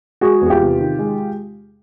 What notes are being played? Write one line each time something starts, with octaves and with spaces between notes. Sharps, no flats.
G#3 F#4 G#4
E2
G#4
F4 G4
C3
D#3
G#3